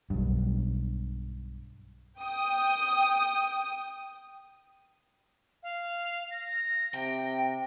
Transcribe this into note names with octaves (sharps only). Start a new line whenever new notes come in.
B1 G2
G5 D#6
F5
A#6
C3 G5